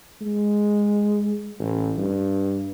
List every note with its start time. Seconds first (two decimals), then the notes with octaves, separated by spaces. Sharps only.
0.22 G#3
1.59 A1
1.97 G2